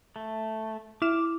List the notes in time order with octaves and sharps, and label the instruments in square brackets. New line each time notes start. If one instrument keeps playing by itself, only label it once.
[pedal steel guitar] A3
[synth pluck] E4 F6 E7 [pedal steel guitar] D6